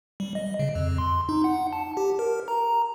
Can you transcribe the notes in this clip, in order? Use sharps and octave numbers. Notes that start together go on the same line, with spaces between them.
G3
D#5
C#3
F2
C6
D#4
F#5
A5
G4
A#4
A#5